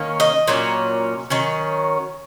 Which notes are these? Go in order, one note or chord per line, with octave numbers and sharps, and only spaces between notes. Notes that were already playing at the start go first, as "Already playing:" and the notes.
Already playing: D#3 A#3 C#4
D#5
A#2 F#3 C#4
D#3 F#3 C#4